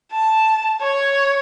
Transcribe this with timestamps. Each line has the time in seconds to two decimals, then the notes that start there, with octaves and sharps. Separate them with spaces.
0.12 A5
0.81 C#5